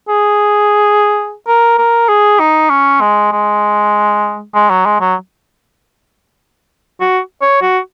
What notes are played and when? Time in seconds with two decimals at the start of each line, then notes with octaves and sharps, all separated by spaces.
0.09 G#4
1.47 A#4
1.78 A#4
2.09 G#4
2.39 D#4
2.70 C#4
3.01 G#3
3.32 G#3
4.55 G#3
4.70 F#3
4.85 G#3
5.01 F#3
7.00 F#4
7.41 C#5
7.62 F#4